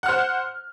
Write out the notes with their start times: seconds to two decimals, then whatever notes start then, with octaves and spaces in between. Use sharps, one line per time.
0.03 F#5
0.06 F6
0.08 C5